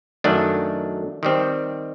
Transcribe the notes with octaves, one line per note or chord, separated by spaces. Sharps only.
F#2 D#3 F#3 A3 D4
D#3 G3 C4